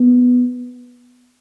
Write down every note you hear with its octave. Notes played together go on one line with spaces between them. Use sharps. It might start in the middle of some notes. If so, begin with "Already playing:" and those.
Already playing: B3